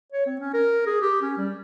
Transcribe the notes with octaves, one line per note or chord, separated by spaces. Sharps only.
C#5
C4
C#4
A#4
G#4
G4
C#4
G3